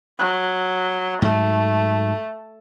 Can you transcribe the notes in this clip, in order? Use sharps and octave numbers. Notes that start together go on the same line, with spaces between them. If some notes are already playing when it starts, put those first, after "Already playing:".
F#3
G#2 F#3 A3